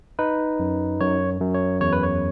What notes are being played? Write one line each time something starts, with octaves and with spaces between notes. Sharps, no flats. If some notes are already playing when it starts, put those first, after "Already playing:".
D#4 B4
F#2
F#2 C#5
F#2
C#5
E2 C#5
B4
C#5